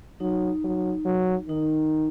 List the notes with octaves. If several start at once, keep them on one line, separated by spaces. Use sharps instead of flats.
F#3 D#4
F#3
F#3
D#3 D#4